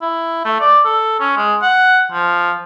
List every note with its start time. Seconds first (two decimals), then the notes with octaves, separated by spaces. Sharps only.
0.02 E4
0.45 A3
0.60 D5
0.85 A4
1.20 C#4
1.37 G#3
1.62 F#5
2.12 F3